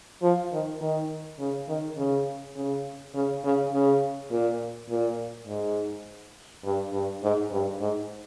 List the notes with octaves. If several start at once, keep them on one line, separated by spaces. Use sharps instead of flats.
F3
D#3
D#3
C#3
D#3
C#3
C#3
C#3
C#3
C#3
A#2
A#2
G#2
G2
G2
G#2
G2
G#2